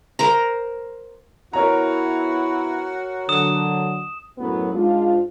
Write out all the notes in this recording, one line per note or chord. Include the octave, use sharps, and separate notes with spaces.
A#4 C5 A#5
B3 E4 F#4 A#4 C#5 A#5
D3 F#3 D#6 E7
F#2 A2 F#3 B3
G#2 D4 F4